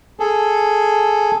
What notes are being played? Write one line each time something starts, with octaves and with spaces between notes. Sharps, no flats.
G#4 A4